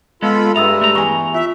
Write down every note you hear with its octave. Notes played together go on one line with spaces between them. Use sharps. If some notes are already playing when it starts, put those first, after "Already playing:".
G#3 B3 F4 A4 B5
G2 G3 G#3 E5 A#5 D#6 E6
A3 A#5
E2 G#5 A#5 C#6
F4 E5